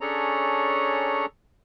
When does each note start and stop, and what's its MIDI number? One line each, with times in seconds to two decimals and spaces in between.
0.01 1.26 61
0.01 1.26 62
0.01 1.26 68
0.01 1.26 69
0.01 1.26 73
0.01 1.26 82